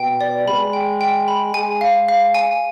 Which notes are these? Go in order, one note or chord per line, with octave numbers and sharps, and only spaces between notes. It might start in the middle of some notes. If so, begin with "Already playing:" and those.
Already playing: B2 G5
D5
G#3 B5
G5
G5
B5
G#3 G#5
F5
F5
G#5